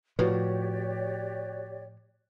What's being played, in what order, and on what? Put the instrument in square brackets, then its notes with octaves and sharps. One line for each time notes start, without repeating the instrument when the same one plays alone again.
[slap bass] A2 F3 [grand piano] F#4 [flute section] G4 C#5 D5 [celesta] B4